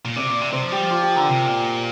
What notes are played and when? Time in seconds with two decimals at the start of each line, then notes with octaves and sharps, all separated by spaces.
0.05 A#2
0.16 C3 D5
0.28 A#2
0.41 C3
0.53 C3 C5
0.62 F3
0.72 G3 G4
0.81 F3
0.91 F4
1.03 G4
1.16 D3 A#4
1.28 C3
1.46 A#2